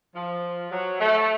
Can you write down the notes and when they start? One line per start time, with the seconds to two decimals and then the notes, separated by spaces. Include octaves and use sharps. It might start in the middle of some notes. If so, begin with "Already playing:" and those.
0.15 F3
0.71 F#3
1.00 A3